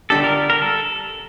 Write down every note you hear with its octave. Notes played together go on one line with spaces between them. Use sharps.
D3 G3 D4 G4 A4
A#4
A#4
A4